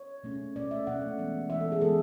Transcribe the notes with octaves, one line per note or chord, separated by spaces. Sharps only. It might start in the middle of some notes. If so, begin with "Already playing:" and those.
Already playing: C#5
B2 A3 C#4
B2 A3 C#4 D5
E5
B2 A3 C#4 F#5
E3 G#3 B3
E3 G#3 B3 E5
A4
G#4
E3 G#3 B3 A4